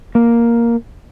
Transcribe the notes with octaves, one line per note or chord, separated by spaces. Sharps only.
A#3